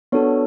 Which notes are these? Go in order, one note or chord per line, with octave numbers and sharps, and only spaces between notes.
B3 D4 F#4 A4 C#5